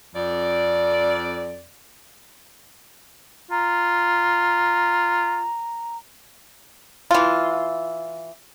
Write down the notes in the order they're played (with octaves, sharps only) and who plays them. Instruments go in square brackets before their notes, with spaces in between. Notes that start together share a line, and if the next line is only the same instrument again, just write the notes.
[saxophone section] F2 D5
[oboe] F4 [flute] A#5
[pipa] E3 F4